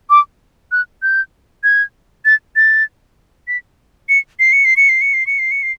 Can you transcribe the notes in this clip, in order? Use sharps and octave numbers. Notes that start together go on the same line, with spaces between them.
D6
F#6
G6
G#6
A6
A6
B6
C#7
C7
C#7
C7
C#7
C7
C#7
C7
C#7
C7
C#7
C7